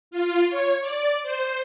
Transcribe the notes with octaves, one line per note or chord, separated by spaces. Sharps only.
F4
C#5
D5
C5